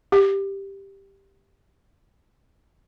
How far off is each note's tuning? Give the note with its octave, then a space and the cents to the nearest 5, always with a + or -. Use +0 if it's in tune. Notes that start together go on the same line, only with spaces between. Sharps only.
G4 +0